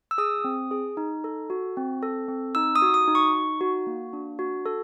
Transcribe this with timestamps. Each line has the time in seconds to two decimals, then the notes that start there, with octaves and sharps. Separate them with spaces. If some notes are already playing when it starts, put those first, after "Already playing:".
0.11 E6
0.18 G#4 D#6
0.44 C4
0.71 G#4
0.97 D#4
1.24 A4
1.50 F#4
1.77 C4
2.03 A4
2.28 C4
2.55 D#4 E6
2.76 D#6
2.82 F#4
2.94 D#6
3.08 D#4
3.15 C#6
3.34 D#4
3.61 F#4
3.87 A#3
4.13 D4
4.39 F#4
4.66 A4